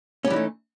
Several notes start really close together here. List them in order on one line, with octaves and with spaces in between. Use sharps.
C#4 G3 E3 D#4 A3